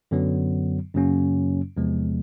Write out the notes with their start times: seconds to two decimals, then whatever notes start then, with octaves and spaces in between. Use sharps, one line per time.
0.11 F#2 D3 F#3 B3
0.94 F#2 C#3 F#3 A#3 C#4
1.77 E2 C3 F3 G#3 B3